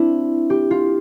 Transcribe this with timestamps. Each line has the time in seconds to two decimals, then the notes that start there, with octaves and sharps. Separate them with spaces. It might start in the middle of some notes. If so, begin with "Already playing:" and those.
Already playing: C4 D4 E4
0.50 G4
0.71 F4